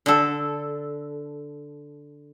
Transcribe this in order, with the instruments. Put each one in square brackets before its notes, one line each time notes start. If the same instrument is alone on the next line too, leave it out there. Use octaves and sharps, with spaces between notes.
[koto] D3 A4